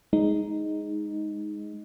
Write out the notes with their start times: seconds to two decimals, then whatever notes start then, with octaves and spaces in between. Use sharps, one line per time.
0.13 G#3 D#4